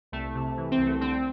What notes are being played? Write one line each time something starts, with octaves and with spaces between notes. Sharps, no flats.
C2 A3
C3
E3
C4
C2
A3
D3 C4